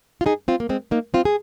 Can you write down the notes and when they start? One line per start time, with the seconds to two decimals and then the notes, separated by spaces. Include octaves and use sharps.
0.21 F4
0.26 D#4 G#4
0.48 C4 F4
0.60 A#3
0.69 G#3 C4
0.91 A#3 D#4
1.14 C4 F4
1.25 G#4